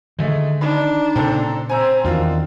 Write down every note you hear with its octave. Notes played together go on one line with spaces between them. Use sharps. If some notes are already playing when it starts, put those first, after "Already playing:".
D3 D#3 G#3 A3
D4 D#4 B5
A#2 C#3 C4 A4 A#5
C4 C5 G#5 A#5 E6
E2 D#3 D4 F4 F#4